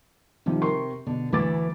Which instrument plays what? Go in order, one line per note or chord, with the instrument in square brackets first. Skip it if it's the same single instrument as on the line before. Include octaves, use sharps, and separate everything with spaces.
[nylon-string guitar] C3 [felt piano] D#3 F3 G3
[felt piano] A#4 C6 C#6
[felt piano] B2 [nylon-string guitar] D3
[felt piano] D2 D6 A6 [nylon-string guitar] E3 A3